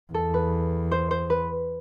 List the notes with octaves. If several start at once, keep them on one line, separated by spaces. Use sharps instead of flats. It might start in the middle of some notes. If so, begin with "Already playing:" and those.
E2 A4
B4
C5
C5
B4